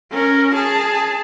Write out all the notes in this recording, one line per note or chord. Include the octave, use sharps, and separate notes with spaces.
C#4 A#4
G#4 A5